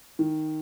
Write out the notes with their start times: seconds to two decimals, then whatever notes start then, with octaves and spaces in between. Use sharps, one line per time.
0.19 D#3